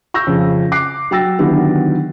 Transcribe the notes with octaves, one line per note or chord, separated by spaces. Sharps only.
C#6 E6 G6 A#6
F2 C#3
D6 F#6 C7
F#3 G5 E6 A6 A#6
D3 D#3 F#3 B3 E4 G4